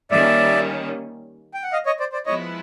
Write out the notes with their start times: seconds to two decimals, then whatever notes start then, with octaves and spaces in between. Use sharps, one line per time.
0.10 D#3 G3 A#3 C#4 D5 E5
1.54 G5
1.63 F#5
1.72 D#5 F5
1.86 C#5 D#5
2.00 C5 D5
2.12 C5 D5
2.26 F3 G#3 B3 E4 C#5 D#5